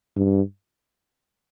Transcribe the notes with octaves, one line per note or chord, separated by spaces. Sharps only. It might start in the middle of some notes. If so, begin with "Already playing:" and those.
G2